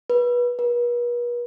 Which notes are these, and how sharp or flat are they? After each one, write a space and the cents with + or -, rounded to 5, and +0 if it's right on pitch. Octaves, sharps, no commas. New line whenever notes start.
B4 -25
B4 -45